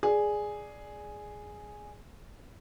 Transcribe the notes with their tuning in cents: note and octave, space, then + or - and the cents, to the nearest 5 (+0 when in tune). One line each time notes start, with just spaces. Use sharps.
G#4 +0 D5 +0